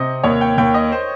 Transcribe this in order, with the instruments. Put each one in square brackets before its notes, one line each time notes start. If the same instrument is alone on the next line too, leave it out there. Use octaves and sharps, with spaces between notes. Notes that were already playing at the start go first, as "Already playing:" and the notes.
Already playing: [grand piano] C3 C4 [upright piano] D#5
[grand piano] D#2 [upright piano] C#5
[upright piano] G5
[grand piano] D#2 [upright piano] G5
[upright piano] D#5
C5